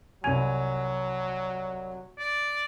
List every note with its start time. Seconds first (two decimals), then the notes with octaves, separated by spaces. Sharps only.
0.24 C2 F#3 G#5 G#6 D#7 F7
2.18 D5